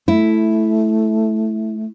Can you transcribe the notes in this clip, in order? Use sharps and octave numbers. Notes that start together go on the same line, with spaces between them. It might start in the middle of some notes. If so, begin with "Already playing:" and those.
A3 E4